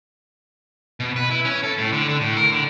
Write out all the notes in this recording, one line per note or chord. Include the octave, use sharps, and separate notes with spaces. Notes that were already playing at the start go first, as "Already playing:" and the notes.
B2
B4
E4
C#4
A4
A2
D3
D3
A2
A#4
D3